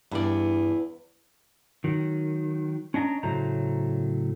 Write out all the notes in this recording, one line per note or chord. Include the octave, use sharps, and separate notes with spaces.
E2 G2 B3 E4 D5
D#3 F#3
C#4 D4 D#5 G#5 A#5
A2 C#3 F#3 A3 C5 A#5